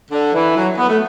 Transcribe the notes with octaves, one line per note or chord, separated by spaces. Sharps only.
D3
E3
F#3
B3
A3